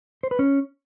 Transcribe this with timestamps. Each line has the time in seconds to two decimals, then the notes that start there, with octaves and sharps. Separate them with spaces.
0.23 C5
0.31 B4
0.39 C#4